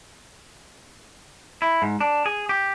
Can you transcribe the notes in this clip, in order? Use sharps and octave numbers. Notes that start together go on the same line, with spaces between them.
E4
G#2
D4
G#4
G4